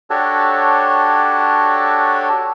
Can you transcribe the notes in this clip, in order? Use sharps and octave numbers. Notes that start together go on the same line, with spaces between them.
D4 F#4 G4 A4 C#5